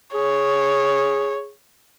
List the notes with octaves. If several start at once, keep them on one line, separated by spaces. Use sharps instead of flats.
G#4 C#5